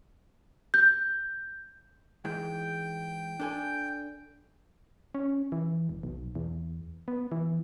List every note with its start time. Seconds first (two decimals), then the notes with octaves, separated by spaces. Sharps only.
0.74 G6
2.25 G#2 E3 G#3 G5
3.40 D4 A4 G#5
5.15 C#4
5.52 E3
5.89 E1
6.03 B1
6.35 E2
7.08 B3
7.32 E3